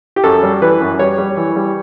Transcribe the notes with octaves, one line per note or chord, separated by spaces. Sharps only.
G4
F#2 A4
G3
E3 B4
F#2
G3 C#5
G3
E3
G3